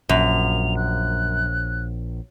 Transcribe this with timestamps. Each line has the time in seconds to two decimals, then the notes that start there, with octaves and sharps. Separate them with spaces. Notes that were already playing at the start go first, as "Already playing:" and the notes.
0.09 A#1 F#2 F7
0.77 F#6